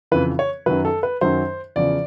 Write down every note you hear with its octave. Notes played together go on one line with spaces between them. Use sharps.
F2 C#3 E3 B4
C#5
F#2 D#3 F#3 B4
A4
B4
F#2 D#3 F#3 C5
E2 C#3 F3 D5